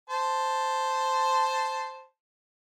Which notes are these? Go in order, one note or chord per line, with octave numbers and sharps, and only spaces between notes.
C5 A5